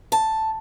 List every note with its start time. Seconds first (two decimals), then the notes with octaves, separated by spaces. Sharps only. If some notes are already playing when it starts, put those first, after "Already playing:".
0.12 A5